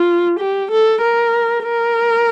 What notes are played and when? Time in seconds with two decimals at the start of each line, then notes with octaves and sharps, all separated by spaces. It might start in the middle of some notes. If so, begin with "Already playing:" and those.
Already playing: F4
0.39 G4
0.71 A4
1.02 A#4
1.64 A#4